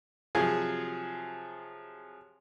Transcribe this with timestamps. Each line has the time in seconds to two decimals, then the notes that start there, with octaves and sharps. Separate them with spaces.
0.35 C3 F3 F#3 G#4 G#5